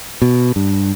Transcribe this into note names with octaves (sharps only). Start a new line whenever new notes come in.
B2
G2